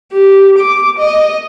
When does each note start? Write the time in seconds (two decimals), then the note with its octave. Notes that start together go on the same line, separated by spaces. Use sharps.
0.13 G4
0.58 D6
0.98 D#5